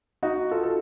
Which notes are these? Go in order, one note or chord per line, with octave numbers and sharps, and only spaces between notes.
D#4 F#4
F4 A4
A4